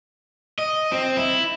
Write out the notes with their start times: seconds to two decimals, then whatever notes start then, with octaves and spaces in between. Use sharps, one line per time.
0.58 D#5
0.92 C4
1.17 E4